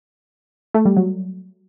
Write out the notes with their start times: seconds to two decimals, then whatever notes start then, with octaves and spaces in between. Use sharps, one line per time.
0.74 A3
0.85 G3
0.97 F#3